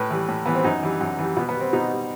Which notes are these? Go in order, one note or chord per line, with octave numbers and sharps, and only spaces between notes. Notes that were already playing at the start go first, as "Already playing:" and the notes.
Already playing: A2 B4
E3 G3
A2
E3 G3 B3
C4
F#2 D#4
E3 G3
F#2
E3 G3
B2 B3
B3
G3
C4
B2 D#4
G3